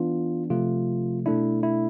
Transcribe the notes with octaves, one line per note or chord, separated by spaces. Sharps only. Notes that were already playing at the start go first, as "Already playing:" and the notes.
Already playing: E3 B3 D4 F4
C3 F3 A3 F4
B2 A3 D4 E4
E4